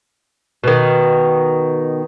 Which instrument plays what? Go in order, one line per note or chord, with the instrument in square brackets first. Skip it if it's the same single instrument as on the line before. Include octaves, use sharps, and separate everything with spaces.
[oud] B2 D#3